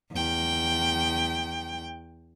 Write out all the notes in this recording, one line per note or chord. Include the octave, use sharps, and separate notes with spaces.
E2 G5